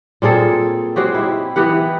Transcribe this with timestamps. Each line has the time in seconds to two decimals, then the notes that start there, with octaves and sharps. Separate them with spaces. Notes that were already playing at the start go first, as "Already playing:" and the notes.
0.22 A#2 C4 G#4 A4
0.96 G#3 C4 F#4 G4
1.15 E4 G4
1.56 E3 B3 G4 F#5